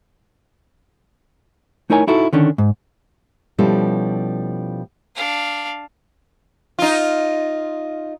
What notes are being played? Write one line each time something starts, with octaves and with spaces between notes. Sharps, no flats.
A3 D#4 E4 A#4 C#5 G#5
D#4 E4 F#4 A4
D3 D#3 C#4 D4
G#2
B2 F3 G3 C#4 E4 A4
D4 F5
D#4 F4